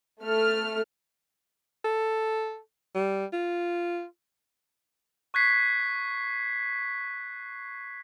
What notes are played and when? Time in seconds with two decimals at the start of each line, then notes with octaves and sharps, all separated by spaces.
0.23 A3 A4 F6
1.84 A4
2.95 G3
3.33 F4
5.34 C#6 F#6 G#6 B6 C7